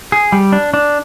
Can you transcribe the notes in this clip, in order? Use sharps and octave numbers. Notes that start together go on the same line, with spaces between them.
G#4
G3
D4
D4